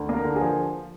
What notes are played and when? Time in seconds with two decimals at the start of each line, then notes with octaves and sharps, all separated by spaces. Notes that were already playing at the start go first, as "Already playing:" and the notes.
Already playing: D2
0.09 A#3
0.14 A#4
0.25 D3
0.36 G#4
0.41 F3